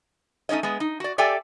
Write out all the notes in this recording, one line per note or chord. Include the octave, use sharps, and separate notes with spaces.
A3 C#4 D#4 C#5 D#5
G#3 B3
D#4
F#4 D5
G4 A4 D5 E5 G5 G#5